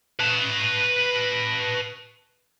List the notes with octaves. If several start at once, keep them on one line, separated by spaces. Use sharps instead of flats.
B4 A5